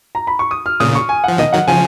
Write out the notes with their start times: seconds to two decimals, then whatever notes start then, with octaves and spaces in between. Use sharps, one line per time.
0.15 A#5
0.27 B5
0.39 C#6
0.51 D#6
0.66 F6
0.80 A#2 C#3 D#6
0.95 C#6
1.09 G#5
1.24 F3 F#5
1.38 B2 D#3 D#5
1.53 D#3 F#3 F#5
1.67 C#3 F3 G#5